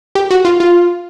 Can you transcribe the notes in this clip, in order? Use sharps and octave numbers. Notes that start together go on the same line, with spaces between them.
G4
F#4
F4
F4